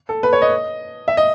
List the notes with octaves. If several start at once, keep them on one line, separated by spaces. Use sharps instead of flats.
A4
B4
C#5
D#5
E5
D#5